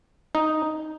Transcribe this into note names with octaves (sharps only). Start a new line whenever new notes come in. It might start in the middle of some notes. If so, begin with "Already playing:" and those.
D#4